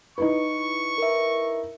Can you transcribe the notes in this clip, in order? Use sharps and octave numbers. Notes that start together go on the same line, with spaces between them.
D#4 E4 B4 C#6
A#4 E5